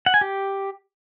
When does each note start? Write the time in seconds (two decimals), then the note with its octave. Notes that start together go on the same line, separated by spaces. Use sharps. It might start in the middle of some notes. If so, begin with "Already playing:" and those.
0.06 F#5
0.14 G#5
0.21 G4